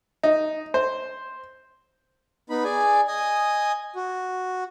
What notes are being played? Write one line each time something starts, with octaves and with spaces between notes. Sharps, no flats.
D#4
C5
B3 D#4 B5
G#4 D5 G#5
D#5 G#5 D#6
F#4